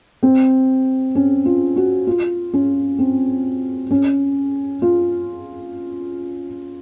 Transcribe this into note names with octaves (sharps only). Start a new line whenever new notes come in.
C4
C#4
F4
F#4
F4
C#4
C4
C#4
F4